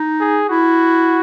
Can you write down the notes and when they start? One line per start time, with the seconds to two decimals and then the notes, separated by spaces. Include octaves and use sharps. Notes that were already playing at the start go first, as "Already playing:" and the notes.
Already playing: D#4
0.20 G#4
0.49 E4 F#4